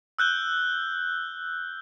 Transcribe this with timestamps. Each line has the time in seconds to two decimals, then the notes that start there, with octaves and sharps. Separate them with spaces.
0.19 E6 F#6 G6 G7